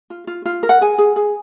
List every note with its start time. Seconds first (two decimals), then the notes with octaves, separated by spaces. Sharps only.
0.10 F4
0.27 F4
0.46 F4
0.63 A#4
0.69 F#5
0.81 G#4 G#5
0.98 G#4
1.16 G#4